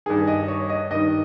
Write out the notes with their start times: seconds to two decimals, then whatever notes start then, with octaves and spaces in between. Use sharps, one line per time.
0.06 G2 D#3 G#4
0.27 D#5
0.48 C#5
0.69 D#5
0.91 G2 D#3 D#5